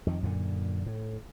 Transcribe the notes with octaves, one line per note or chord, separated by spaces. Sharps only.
F2 D#3
F#2 A#2 D3
A2